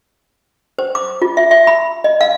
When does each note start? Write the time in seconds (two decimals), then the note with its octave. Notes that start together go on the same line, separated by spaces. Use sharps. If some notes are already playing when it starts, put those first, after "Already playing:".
0.79 C5
0.95 D6
1.22 F4
1.37 E5
1.51 E5
1.67 B5
2.04 D#5
2.21 F5